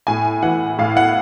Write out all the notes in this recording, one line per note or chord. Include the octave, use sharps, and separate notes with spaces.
A2 G#5
E3 F#5
A2 F5
F#5